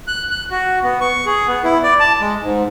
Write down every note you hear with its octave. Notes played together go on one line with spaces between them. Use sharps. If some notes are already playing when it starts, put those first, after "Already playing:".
F#6
F#6
F#4
B3
C#6
G#4
B3
E4
D5
A5
G#3
G#2